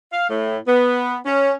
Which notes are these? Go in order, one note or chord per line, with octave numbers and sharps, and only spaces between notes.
F5
A2
B3
C#4